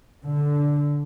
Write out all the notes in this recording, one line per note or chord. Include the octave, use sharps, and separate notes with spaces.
D3